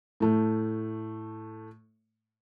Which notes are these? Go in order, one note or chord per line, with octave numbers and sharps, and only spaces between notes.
A2 A3